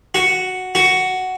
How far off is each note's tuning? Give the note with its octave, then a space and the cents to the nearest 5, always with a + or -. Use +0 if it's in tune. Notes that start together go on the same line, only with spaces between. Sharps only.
F#4 +0
F#4 +5